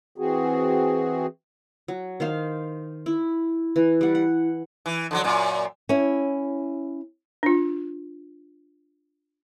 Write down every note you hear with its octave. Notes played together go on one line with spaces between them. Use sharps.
E3 C4 F#4 G#4
F#3
D#3 C5 F5
E4
E3
G3 F#5
F#5
E3
D3 E3 F#3
F#2 A#2
C#4 E4
D4 F4